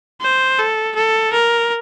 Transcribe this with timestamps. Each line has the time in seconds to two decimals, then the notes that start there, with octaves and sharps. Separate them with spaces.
0.21 C5
0.59 A4
0.96 A4
1.33 A#4